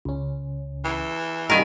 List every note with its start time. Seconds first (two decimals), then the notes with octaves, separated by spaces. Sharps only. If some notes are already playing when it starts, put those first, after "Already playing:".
0.05 C#2 C#4
0.84 E3
1.50 C3 D#3 G3 F#4 A#4 G#5 B5